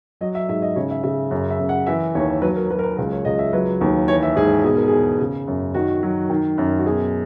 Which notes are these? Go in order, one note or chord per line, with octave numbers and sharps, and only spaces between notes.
F#3 D#5
E5
G#2 E5
D#5
C#3 C#5
E5
C#3 E5
F#2
E5
F#2
F#5
E3 E5
D#2 C#5
F#3 B4
A#4
F#3 B4
A#4
B4
C#2 A#4
C#5
C#2 D#5
E5
F#3 B4
D#2
E3 C#5
E5
G#2 G#4
B2 G#4
A#4
E2 G#4
C#3
F#2
D#3 F#4
F#3
D#3
F#2
F#4
B2 G#4